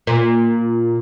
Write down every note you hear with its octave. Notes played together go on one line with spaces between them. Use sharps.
A#2